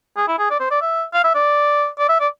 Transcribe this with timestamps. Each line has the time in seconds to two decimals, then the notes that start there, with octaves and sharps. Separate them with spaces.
0.17 G#4
0.28 E4
0.39 G#4
0.50 D5
0.60 C5
0.71 D5
0.81 E5
1.13 F5
1.24 E5
1.35 D5
1.99 D5
2.09 E5
2.20 D5